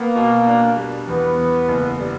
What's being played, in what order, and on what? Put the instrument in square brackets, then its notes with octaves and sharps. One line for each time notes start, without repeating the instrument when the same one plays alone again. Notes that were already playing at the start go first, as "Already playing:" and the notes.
Already playing: [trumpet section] A#3 [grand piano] B3
[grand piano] B2
D4
G3
[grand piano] E2 [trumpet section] B3
[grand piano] E2
F#1
G3